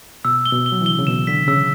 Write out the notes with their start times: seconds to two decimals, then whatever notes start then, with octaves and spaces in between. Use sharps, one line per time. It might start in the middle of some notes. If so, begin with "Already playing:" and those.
0.25 B2 E6
0.46 G7
0.52 B2
0.66 G7
0.72 F#3
0.81 E3
0.86 D3 G7
0.99 C#3
1.07 B2 E7
1.27 D3 B6
1.48 C#3 E6